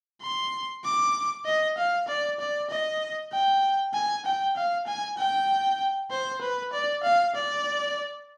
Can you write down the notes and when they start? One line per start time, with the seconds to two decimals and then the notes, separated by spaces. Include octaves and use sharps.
0.22 C6
0.84 D6
1.46 D#5
1.78 F5
2.08 D5
2.40 D5
2.70 D#5
3.32 G5
3.94 G#5
4.26 G5
4.56 F5
4.87 G#5
5.18 G5
6.11 C5
6.41 B4
6.73 D5
7.03 F5
7.35 D5